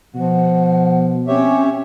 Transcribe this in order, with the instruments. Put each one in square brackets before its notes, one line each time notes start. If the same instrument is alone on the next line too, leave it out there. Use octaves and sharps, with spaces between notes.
[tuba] B2 [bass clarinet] F3 [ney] F#5
[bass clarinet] C4 [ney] C#4 [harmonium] G4 C#5 E5